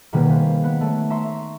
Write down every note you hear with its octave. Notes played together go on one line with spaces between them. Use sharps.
B2 D#3 G3 A#3 G#4 B4
B4 C5 F5
B3 B5 F#6
A3 C#5
E5 A#5 C6 C#6